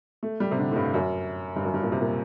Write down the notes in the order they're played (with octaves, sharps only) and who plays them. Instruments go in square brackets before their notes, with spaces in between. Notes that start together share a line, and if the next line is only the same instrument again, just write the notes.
[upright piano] A3
G3
C3
D3
A2
G2
F#2
G2
F#2
G2
A#2
C3
A#2